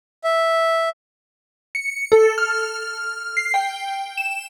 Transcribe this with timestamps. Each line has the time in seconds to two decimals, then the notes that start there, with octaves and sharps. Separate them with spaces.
0.24 E5
1.75 C#7
2.12 A4
2.38 F6
3.37 C7
3.54 G5
4.17 E7